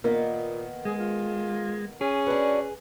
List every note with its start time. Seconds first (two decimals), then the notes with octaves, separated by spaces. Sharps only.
0.04 A#2 D#3 A#3 B3
0.85 G#3 G#4
1.00 F4
2.01 C#4 G#4
2.26 D4 F#4 B4